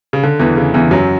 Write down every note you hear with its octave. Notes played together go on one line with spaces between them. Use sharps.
C#3
D3
E2 E3
C#3
E2 E3
F#2 F#3